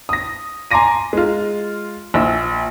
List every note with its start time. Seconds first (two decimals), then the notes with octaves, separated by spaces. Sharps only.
0.09 D#6 A#6
0.71 G#5 A#5 C6 D6 A#6 D#7
1.13 G#3 F4
2.14 A#1 F4 E6